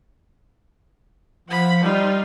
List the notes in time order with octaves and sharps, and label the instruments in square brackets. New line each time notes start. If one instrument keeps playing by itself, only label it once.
[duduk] F3 [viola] F#5 B5
[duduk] G3 [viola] D#4 F4